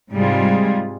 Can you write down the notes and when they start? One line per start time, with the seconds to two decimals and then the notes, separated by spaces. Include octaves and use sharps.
0.12 G#2 C3 G3 G#3 F4 G#4